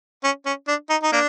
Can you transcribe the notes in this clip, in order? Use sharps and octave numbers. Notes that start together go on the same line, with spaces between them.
C#4
C#4
D4
D#4
D#4
A#3 D4